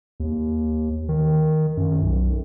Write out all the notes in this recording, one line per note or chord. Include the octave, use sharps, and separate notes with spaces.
D#2
D#3
F#2
B1